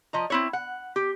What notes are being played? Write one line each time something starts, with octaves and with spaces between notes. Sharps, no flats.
F3 D#5 A#5
C4 E4 C#5
F#5
G4